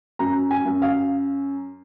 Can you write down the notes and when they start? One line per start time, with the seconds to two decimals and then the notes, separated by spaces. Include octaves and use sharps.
0.19 F#2 A#5
0.51 G#5
0.65 F#2
0.82 F5